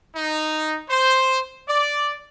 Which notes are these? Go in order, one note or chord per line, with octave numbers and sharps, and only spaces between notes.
D#4
C5
D5